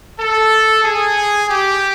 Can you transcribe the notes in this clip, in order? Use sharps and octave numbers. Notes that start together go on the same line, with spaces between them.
A4
G#4
G4